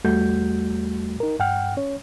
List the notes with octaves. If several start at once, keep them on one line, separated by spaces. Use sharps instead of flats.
E2 G3 A3 F#4 G6
D#4 A#4
G2 F#5 G5 F6
C#4 C#5